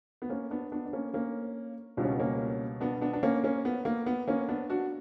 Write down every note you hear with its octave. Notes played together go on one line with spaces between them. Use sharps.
B3
A#3 C#4
B3 D4
B3 D4
D4
A#3 C#4
A#3 C#4
C#2 B2 G3 D4
C#4
B3
A#3 C#4
B3 D4
B3 D4
D4
A#3 C#4
A#3 C#4
B3
A#3
B3
A#3 C#4
B3 D4
D4 F#4